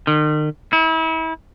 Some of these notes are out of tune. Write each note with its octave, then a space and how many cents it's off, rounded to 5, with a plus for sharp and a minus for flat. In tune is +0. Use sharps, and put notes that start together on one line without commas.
D#3 -40
E4 -35